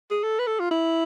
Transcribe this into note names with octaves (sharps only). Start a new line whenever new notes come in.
G#4
A4
B4
A4
F4
E4